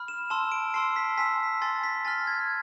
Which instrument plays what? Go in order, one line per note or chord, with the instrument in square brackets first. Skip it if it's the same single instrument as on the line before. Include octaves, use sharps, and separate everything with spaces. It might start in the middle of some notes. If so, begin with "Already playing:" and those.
Already playing: [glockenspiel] B5 F6
E7
A5 C6 E6 E7
D7
A5 C6 E6 C7
B6
G#5 C6 E6 B6
G#5 C6 E6 A6
B6
G#5 C6 F6 A6
G#6